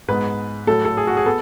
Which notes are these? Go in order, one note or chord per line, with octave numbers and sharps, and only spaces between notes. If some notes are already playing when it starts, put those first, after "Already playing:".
G#2 G#3 B3 B4
A2 F#3 A3 A4
A4
G#4
F#4
G#4
B3 A4